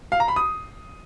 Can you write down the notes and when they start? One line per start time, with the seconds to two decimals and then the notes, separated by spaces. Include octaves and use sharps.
0.12 F5
0.20 A#5
0.28 B5
0.36 D#6